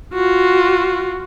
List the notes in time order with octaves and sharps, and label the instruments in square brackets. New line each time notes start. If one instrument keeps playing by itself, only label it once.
[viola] F4 F#4